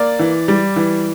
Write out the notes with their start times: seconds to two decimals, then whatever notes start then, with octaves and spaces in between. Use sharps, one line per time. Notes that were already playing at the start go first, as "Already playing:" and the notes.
Already playing: A#3 D5
0.19 E3
0.48 G3
0.76 E3